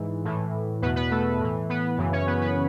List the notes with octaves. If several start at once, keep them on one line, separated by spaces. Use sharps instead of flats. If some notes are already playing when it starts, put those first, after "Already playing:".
Already playing: G#2 E3
A2 E3
E2 B2 B3 B4
B3 B4
A3 A4
A2 E3
B3 B4
F#2 C#3 E3
C#4 C#5
B3 B4
B3 B4